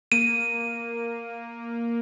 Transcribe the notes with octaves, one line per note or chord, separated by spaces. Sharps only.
A#3 D#7